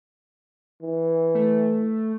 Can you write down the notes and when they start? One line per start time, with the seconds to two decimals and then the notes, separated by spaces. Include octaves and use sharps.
0.82 E3
1.35 A3